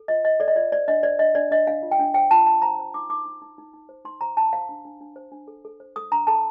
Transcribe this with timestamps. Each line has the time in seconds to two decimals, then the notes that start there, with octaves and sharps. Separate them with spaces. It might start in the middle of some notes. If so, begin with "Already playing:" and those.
Already playing: A4
0.08 F4 D#5
0.25 C5 D#5
0.40 A4 D5
0.48 D#5
0.56 F4 D5
0.72 C5 D5
0.88 D4 D#5
1.03 C5 D5
1.19 D4 D#5
1.35 D4 D5
1.51 D4 D#5
1.67 D4 F5
1.83 F4
1.91 G5
1.99 D4
2.14 C5 G5
2.31 F4 A5
2.46 F4 A5
2.62 C5 A#5
2.79 C5
2.94 D#4 D6
3.10 D#4 D6
3.25 D#4
3.42 D#4
3.58 D#4
3.74 D#4
3.89 C5
4.05 D#4 C6
4.21 C5 A#5
4.37 D#4 A5
4.53 C5 F5
4.69 D4
4.85 D4
5.01 D4
5.16 C5
5.32 D4
5.48 A4
5.65 A4
5.80 C5
5.96 A4 D#6
6.12 D4 A#5
6.27 A4 A5